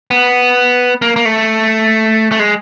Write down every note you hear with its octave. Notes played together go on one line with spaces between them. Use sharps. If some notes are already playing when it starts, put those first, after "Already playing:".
B3
A#3
A#3
A3
A3
G#3